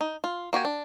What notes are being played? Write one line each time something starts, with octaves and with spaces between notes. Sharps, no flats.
D#4
F4
A#3 F#4 G4 G#5
D4